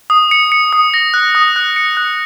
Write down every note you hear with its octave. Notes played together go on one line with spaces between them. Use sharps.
D#6
C#7
C#7
D#6
A#6
F#6
D#6
F#6
C#7
F#6